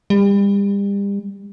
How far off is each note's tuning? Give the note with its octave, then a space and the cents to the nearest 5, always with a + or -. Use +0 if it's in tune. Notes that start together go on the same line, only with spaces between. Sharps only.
G3 +35